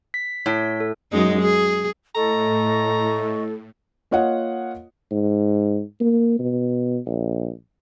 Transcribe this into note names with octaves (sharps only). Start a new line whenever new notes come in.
B6
A2 C#5 B6
A4
F#2 G#3 D#4
G#4
A2 A4 D#5 A#5 C#6
A#3 F4 C#5 D#5 F#5
G#2
A#3
B2
A#1